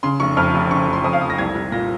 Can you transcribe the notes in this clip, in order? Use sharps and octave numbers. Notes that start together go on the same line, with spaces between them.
C#3 C6
F1 C#6
F2 F6
F1
C#3 C#6
F1
C6
F2 D#6
F5
F1 D#6
A#6
C2 G#6
C2
A#2 A#6